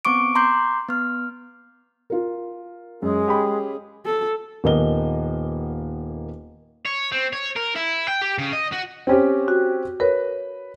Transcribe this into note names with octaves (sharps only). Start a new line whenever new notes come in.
B3 C4 C#6 D6 D7
A#5 C6 D6 G6 C7
B3 F6
F4 A#4
F#2 G#3 C#4 G#4
G4 B5
A4
D#1 A#3 B3 D#5 G7
C#5
C4
C#5
A#4
E4
G5
G4
C#3
D#5
F#4
C4 C#4 G4
F#4
A#4 B4 C#5